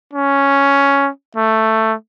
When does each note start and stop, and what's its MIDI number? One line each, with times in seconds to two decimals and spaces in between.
0.13 1.09 61
1.36 1.94 57